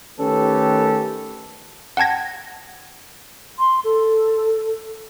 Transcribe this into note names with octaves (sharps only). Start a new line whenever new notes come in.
D#3 A3 C#4 G4 A4 B4
F#5 G5 A5 G#6 A#6
C6
A4